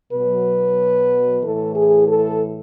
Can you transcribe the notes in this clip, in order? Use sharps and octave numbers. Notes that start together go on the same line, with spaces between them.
B2 F#3 B4
A2 E3 A4
G#4
A4